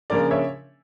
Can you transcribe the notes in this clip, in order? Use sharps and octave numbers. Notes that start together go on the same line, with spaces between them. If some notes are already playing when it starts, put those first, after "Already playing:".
C#3 F3 A#3 D4 A#4 D5
C#5 E5